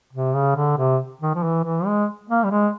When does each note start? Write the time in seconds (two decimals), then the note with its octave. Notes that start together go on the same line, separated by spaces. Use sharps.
0.13 C3
0.35 C#3
0.56 D3
0.77 C3
1.21 D#3
1.35 F3
1.43 E3
1.64 E3
1.86 G#3
2.29 A#3
2.44 G3
2.51 G#3